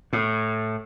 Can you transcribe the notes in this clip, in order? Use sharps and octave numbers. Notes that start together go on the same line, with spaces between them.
A2